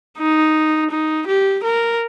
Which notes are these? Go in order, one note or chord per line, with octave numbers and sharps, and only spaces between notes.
D#4
D#4
G4
A#4